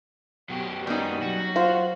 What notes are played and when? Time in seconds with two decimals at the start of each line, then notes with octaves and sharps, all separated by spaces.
0.49 F#2 B2 F#3 G4
0.87 G3 A#3 B3 C#4 D#4
1.22 F#3 F#4
1.56 F4 C5